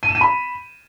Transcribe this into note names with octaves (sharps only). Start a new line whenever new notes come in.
D#7
E7
D#7
B5